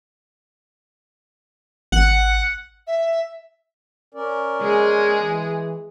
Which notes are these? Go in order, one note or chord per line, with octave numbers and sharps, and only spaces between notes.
G#1 F#5
E5
C#4 A#4 D5
G#3 G#4
E3